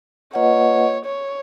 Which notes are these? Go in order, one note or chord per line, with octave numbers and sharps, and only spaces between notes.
A#3 F4 B4 C#5 D#5 F#5
C#5